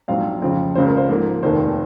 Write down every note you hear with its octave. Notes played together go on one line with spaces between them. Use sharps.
A#1 G#2 F#3 C4 F5
F2 C#3 F3 C4
C#2 C#3 F3 C5
A#4
C5
G#2 F3 A#3
F1 D#2 D#3 A#3 C5